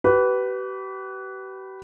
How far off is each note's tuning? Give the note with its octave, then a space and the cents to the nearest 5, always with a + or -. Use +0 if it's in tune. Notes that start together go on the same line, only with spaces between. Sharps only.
G4 -40 B4 +0